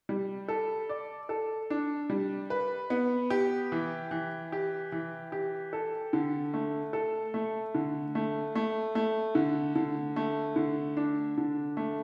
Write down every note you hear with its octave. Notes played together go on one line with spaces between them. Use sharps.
G3
A4
D5
A4
D4
G3
B4
B3
G4
E3
E3
G4
E3
G4
A4
D3
A3
A4
A3
D3
A3
A3
A3
D3
D3
A3
D3
D4
D3
A3